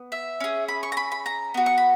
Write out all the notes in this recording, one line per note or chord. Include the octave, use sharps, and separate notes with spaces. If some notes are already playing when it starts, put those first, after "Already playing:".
Already playing: B3
E5
C#4 G#4
B5
C#6
A#5
B5
B5
A#5
B3 F#4
C#6
B5